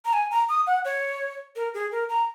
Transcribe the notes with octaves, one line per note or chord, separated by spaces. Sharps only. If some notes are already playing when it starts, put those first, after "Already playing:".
A#5
G#5
A#5
D#6
F#5
C#5
A#4
G#4
A#4
A#5